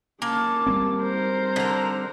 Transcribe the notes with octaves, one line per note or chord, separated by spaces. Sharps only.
A#3 C#4 A5
G3 B3 C4
A#4 C5
D3 A#5